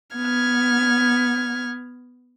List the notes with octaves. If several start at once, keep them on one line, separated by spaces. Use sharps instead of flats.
B3 F6 G#6